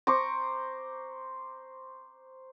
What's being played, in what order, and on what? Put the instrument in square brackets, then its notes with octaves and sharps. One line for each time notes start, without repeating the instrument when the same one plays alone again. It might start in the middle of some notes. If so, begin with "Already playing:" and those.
[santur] C5 A#5 C#6 D6